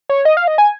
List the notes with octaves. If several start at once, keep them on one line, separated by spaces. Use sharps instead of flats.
C#5
D#5
F5
D#5
G#5